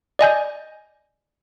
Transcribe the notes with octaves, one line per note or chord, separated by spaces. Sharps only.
D5 D#5 G#5 G6